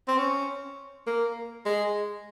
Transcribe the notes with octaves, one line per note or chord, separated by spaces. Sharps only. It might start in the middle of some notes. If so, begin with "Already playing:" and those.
C4
C#4
A#3
G#3